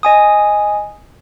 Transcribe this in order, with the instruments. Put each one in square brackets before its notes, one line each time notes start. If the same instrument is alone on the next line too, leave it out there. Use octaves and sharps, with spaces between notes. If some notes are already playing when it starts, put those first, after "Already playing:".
[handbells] D#5 G#5 D#6